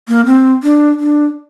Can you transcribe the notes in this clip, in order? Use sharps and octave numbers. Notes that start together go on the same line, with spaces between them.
A#3
C4
D4
D4